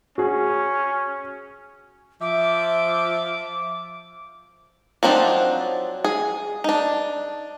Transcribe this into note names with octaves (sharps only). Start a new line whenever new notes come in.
C#4 F#4 G#4
F3 E5 D6
F3 F#3 C4 D4 D#4
G#4
D4 D#4